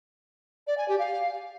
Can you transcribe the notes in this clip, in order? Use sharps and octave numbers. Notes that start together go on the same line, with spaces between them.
D5
G#5
G4
F5